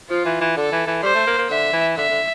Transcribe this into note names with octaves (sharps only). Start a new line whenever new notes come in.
F3 F4
E3
E3
D3 A4
E3
E3
G3 C5
A3
A#3
A#3
D3 E5
E3
D3 E5
D3